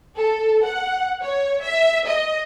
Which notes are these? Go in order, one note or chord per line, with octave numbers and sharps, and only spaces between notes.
A4
F#5
C#5
E5
D#5